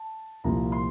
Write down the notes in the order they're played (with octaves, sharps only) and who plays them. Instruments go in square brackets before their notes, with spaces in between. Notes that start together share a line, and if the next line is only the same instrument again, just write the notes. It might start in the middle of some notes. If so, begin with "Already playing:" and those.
Already playing: [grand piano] A5
C2 A#2 F3 A#3 A#5
C6